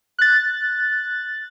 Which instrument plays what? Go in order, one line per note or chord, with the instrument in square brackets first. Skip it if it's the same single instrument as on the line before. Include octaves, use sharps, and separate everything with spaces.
[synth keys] F#6 A6